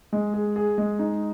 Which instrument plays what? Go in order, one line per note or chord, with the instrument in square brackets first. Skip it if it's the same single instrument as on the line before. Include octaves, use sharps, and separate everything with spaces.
[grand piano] G#3
G#4
G#4
G#3
D#4